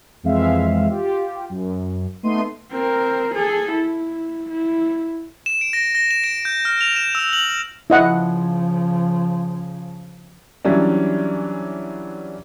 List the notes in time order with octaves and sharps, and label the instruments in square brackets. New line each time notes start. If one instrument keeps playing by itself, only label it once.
[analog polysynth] F2 E3 G#3 C4 E5 F5
F4 G4
F#2
A3 B3 D#4 C6 D#7
[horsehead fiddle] C4 A#4
G#4 A4
E4
E4
[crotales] E7
D7
A#6
A#6
E7
D7
G6
F6
F7
E7
E6
F#7
[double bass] C#3 F3 [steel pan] E4 D#5 F#5
[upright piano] E3 F#3 G3 C#4 D4